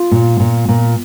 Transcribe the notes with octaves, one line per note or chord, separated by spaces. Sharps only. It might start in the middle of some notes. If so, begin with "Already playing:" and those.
Already playing: F4
A#2
A#2
A#2